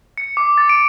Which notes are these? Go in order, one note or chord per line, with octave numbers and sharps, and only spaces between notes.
C#7
D6
A6
D7